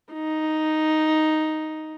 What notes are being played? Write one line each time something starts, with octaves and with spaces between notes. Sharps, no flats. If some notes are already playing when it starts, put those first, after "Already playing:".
D#4